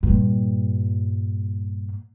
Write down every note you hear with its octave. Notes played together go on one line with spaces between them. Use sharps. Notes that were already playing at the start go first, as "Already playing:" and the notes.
G2 A#2